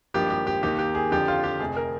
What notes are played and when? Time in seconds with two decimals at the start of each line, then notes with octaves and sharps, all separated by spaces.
0.14 G#1 G2 F3 A#3 G4
0.30 G4
0.47 G4
0.63 D#2 D#3 A#3 G4
0.79 G4
0.95 G#4
1.11 F2 D3 F3 G4
1.28 F4
1.44 G4
1.59 F1 F2 C3 G#4
1.77 A#4